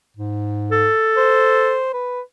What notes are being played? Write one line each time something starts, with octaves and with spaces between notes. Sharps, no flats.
G#2
A4
C5
B4